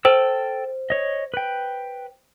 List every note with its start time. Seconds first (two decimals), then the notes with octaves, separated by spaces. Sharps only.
0.05 A4 C5 G5 E6
0.90 C#5 D#5
1.34 B4 G5